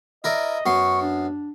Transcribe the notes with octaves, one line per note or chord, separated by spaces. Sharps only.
E4 A#4 D5 D#5
F#2 B3 C6 C#6
D4